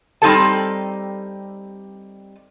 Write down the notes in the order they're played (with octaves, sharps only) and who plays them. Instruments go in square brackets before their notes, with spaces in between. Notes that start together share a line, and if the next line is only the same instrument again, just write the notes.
[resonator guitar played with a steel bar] G3 C4 D#4 G4 A4 A5